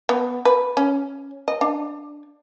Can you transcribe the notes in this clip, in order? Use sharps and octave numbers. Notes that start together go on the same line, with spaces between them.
B3
B4
C#4
D#5
D4